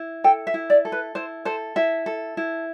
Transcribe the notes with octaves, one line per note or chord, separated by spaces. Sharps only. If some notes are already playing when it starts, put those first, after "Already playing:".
Already playing: E4
A4 G5
E5
E4
D5
A4
B4
E4 C5
A4 C5
E4 E5
A4
E4